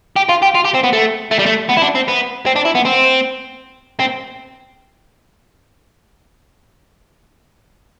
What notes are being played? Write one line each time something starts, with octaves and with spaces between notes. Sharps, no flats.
G4
F4
G4
F4
G4
C4
B3
A3
A3
G3
A3
B3
E4
D4
C4
B3
C4
D4
E4
B3
C4
C4